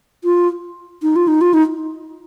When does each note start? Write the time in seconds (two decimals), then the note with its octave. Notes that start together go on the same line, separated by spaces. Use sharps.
0.24 F4
1.02 D#4
1.16 F4
1.28 D#4
1.41 F4
1.54 D#4